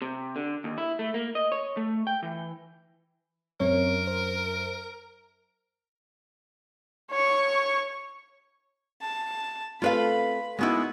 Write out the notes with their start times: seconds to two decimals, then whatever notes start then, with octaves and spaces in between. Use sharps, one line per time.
0.02 C3
0.36 D3
0.64 D#2
0.78 E4
0.99 A3
1.14 A#3
1.35 D#5
1.52 C#5
1.77 A3
2.07 G5
2.23 E3
3.60 F#2 C4 A#4 C#5
4.07 C5
7.11 C#5 C#6
9.02 A5
9.82 A3 C4 F4 A4 B4 F5 B5
10.59 G#3 A#3 B3 D#4 E4 F#4